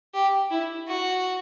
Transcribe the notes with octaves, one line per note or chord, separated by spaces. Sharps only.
G4
E4
F#4